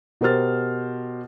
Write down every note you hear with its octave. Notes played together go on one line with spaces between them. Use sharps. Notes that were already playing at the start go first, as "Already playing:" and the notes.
B2 G4 A#4 C5 F6 A6